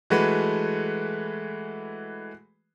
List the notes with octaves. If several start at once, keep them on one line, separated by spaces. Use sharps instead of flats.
E3 G#3 A3 F#4 B4